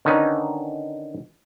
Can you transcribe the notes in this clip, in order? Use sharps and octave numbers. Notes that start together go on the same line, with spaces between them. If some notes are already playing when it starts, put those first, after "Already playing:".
D3 D#3 C#4 D#4 B4